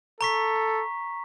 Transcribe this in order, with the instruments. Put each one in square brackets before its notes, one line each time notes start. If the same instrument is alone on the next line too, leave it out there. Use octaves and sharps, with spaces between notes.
[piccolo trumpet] A4 [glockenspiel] A#5 C#6 B6